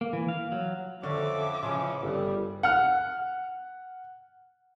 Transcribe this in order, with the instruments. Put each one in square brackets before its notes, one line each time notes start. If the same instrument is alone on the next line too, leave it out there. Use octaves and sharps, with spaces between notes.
[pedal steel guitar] A#3
E3
F5
F#3
[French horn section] F2 [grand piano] D3 [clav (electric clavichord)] C#4 [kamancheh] E5 D6
[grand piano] C#3 [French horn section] E3 G#3 C#4 [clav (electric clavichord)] F3
[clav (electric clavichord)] G1 [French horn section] G3
[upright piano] F#5 F6